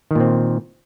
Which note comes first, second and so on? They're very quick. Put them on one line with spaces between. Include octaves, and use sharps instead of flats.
D#3 A#2 C4